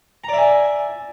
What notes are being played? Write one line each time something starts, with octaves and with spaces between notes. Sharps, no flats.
D5 E5 G#5 A#5